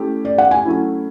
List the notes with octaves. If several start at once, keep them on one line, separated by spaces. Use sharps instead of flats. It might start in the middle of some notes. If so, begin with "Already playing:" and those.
Already playing: A3 C#4 E4 G4
D5
F#5
G#5
F#3 A3 C#4 E4